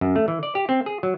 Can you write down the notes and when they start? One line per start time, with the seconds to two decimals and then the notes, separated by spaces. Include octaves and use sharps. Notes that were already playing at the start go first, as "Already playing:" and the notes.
0.01 F#2
0.16 A3
0.28 E3
0.43 D5
0.55 G4
0.69 C4
0.86 G#4
1.03 F#3